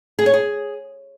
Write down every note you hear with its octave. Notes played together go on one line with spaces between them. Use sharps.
G#4
C#5
G#4